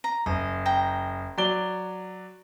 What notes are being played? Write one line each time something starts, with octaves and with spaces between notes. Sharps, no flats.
A#5
F#1 D#5
G5 A#5
F#3 D5 G7